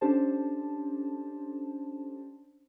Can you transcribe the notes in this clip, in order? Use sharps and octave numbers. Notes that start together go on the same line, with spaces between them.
C#4 D4 G4 A4 C5 A5